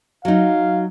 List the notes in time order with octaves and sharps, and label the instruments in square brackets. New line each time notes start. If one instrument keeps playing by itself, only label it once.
[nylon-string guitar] F#3 D#4 [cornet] F5